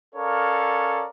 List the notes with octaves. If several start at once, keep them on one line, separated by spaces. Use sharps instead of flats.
C#4 A4 A#4 C#5 D5 F5